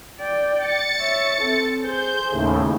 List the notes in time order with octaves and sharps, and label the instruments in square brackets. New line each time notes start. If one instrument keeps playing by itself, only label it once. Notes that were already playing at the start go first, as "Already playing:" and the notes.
[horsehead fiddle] D5 G5
[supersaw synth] A6 C#7
[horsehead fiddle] C#5 E5
C4 A4
[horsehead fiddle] G#4 C5 [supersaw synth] G6
[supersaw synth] D#2 A2 C#3